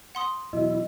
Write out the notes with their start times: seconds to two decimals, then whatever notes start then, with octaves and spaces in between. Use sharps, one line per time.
0.15 F#5 C6 D#6
0.53 E2 B2 F#3 E4 D#5